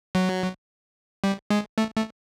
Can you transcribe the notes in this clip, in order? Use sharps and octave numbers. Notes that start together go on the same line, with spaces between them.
F#3
G3
G#3
A3
A3